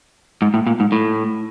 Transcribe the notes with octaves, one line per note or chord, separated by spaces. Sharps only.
G#2
A2
A#2
G#2
A2